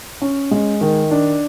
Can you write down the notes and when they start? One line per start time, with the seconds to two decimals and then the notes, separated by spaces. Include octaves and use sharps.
0.22 C#4
0.51 G#3
0.81 D#3
1.11 D4